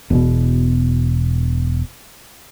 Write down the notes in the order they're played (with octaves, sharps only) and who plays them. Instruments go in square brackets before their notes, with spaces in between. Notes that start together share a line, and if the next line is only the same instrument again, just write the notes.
[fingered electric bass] E1 B2